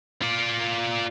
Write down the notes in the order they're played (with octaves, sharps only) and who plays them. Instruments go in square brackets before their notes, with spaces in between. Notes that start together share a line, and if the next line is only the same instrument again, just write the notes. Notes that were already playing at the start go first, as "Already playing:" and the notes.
[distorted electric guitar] F4 D5